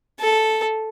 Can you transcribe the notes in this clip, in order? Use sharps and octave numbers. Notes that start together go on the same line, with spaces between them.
A4